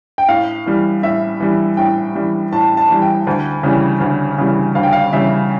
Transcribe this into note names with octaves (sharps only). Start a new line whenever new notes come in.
G5
A2 F5
E3 G3
A2 E5
E3 G3
A2 G5
E3 G3
A2 A5
A5
E3 G3
G5
D2
C#3 E3 G3
D2
C#3 E3 G3
D2 F5
G5
F5
C#3 E3 G3 E5